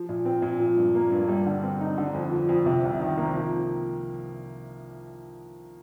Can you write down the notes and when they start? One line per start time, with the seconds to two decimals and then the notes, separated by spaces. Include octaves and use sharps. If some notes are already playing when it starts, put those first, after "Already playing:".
Already playing: F3
0.09 A#2
0.25 C4
0.42 A#2
0.60 F3
0.77 G2
0.95 A#3
1.11 G2
1.29 G3
1.46 D3
1.63 C4
1.80 D#4
1.98 D3
2.14 F2
2.31 F3
2.49 F2
2.66 C3
2.84 C2
3.00 D#3
3.17 A#3
3.34 F3